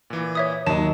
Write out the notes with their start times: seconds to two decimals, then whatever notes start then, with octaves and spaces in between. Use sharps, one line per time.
0.10 A#2 E3
0.35 C#5 E5 D#6
0.67 D#2 F#3 D#5 A5